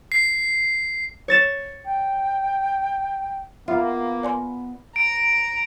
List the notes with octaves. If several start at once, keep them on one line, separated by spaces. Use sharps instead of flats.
C7
C#5 A6 E7
G5
A#3 B3 F4 A#4 E5
D5 G#5 C6
A#5 D7